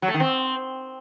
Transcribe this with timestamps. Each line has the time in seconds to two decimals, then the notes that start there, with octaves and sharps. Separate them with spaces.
0.02 F#3
0.08 A3
0.14 D#3
0.20 C4